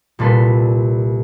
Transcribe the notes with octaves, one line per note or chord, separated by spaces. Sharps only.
C2 A#2 A4 B4 C6